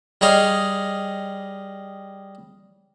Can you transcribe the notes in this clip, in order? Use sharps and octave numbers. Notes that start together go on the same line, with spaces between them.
G3 G#4 C#5 D#5 F5